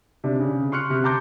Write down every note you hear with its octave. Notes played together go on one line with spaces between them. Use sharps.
C3 D4
C#3
C6 C#6 F6 F#6 C#7
C3
A5 A#5 C6 D6 G6